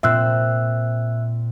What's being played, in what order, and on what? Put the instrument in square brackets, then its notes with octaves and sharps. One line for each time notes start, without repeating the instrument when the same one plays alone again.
[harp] A#2 C4 [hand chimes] E5 E6 F#6